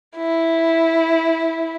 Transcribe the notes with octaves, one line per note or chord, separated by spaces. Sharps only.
E4